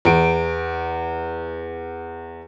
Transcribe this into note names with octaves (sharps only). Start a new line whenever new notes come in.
E2 D7